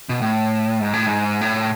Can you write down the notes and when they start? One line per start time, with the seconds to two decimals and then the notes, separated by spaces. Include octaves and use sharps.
0.09 B2
0.21 A2
0.81 G#2
0.93 A2
1.06 G#2
1.41 A2